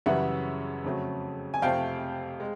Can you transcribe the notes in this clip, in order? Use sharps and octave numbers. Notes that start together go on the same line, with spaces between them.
F#2 C#3 E3 G3 E5 F#5
F2 C#3 F#3 A3
G#5
F2 C3 F3 A3 F5 G5
G#3